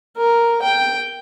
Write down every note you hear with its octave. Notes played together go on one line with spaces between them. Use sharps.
A#4
G5